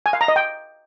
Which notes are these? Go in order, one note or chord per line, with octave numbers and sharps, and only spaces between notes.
G#5
F5
A#5
D#5
G5